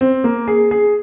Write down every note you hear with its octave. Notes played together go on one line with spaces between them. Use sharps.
C4
A#3
G#4
G#4